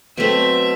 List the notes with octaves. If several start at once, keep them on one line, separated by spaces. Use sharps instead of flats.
B2 F#3 A3 C4 E5